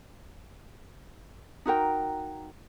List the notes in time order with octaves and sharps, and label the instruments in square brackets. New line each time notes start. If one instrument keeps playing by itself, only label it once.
[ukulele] D#4 F#4 A#4 G5